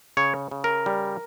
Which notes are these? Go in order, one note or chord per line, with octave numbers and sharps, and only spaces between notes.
C#3 C#5
C#3
A#4
G3